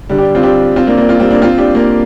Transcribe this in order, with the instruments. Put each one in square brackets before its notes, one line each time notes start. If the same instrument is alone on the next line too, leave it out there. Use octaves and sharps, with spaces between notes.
[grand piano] D3 G3
D4 G4
C4 F4
D4 G4
C4 F4
A#3 D4
A#3 D4
C4 F4
G3 C4
A#3 D4
C4 F4
D4 G4
A#3 D4